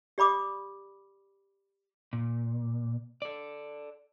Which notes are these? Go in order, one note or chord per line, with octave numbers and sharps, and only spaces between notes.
G4 D5 B5 D6 D#6
A#2
A4 D5